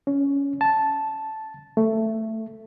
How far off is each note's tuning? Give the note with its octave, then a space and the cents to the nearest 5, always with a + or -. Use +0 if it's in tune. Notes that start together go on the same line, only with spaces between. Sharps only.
C#4 +15
A5 -5
A3 +10